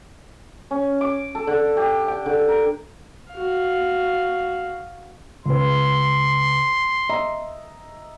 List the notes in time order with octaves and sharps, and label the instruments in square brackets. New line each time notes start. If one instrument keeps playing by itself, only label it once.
[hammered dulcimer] C#4
D6
A4
D3
G4
G5
D3
A#4
[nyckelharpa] F#4 F5
[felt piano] C#2 B4 [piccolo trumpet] C6
[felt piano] D#5 E5 A#5